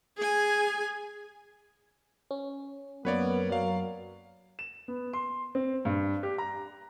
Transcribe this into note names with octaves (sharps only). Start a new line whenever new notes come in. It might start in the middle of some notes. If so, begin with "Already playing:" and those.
G#4 G#5
C#4
F#2 A#3 B3 A#4 B4 C#5 D5
F#3 D5 F5
E7
B3
C6
C4
G2
G4
A#5